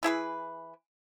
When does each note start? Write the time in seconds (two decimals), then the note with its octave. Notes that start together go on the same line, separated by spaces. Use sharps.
0.03 E3 E4 G#4 B4